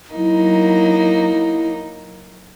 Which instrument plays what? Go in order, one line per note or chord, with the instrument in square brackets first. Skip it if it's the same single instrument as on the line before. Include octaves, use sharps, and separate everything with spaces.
[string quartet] F#3 A#3 D#4 [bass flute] E4